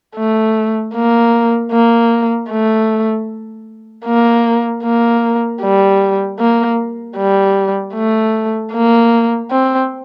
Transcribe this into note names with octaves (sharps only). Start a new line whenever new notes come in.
A3
A#3
A#3
A3
A#3
A#3
G3
A#3
G3
A3
A#3
C4